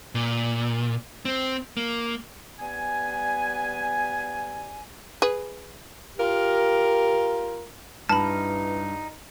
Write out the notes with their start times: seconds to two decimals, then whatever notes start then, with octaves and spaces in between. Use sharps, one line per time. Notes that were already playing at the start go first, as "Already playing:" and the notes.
0.15 A#2
1.25 C4
1.77 A#3
2.60 G3 B3 B4 G#5
5.22 G#4 B4
6.18 F4 G4 A#4
8.09 G2 E3 D#4 A5 B5 F6